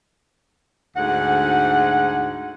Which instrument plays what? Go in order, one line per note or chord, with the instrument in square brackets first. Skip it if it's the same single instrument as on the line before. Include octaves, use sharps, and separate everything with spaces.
[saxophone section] D2 G#2 F#5